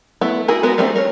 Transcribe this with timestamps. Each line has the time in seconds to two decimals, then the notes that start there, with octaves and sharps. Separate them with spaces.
0.21 A3 B3 E4
0.48 D#4 E4 F#4 G#4 A#4
0.63 G#3 B3 F#4 A#4
0.78 G3 A3 C4 D4
0.96 A#4 C#5